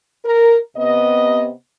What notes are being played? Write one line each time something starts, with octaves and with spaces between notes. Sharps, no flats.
A#4
C3 B3 D#5